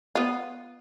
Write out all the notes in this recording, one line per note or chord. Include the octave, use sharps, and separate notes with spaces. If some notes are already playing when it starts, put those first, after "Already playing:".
B3 F4